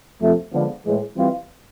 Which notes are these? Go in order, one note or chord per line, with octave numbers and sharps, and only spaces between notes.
F2 C3 F3 A3
D3 F3 G#3 B3 D4
A2 E3 G#3
E3 G3 C4 F4